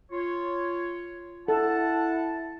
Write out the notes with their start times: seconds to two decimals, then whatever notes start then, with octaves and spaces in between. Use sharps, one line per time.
0.12 F4 C#5
1.48 E4 A4 F#5 A5